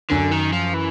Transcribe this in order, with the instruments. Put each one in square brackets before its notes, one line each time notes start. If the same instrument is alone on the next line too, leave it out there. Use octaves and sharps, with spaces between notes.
[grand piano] F#2 [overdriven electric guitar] D3
[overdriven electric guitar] D#3
F3
E3